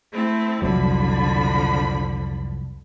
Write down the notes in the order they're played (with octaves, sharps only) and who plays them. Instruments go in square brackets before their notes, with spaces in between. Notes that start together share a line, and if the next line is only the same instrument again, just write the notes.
[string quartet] A3 C4 E4
[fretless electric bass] C2 F2 F#3 [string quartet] D3 F3 B5